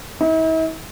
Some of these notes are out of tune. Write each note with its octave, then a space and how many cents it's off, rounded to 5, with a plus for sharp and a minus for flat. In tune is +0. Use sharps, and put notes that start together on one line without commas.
E4 -45